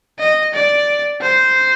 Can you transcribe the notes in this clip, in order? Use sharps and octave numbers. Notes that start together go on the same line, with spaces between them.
D#5
D5
C5